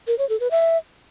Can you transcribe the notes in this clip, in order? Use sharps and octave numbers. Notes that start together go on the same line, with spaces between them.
A#4
C#5
A4
B4
E5